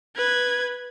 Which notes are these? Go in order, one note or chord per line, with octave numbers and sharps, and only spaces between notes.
B4 G#6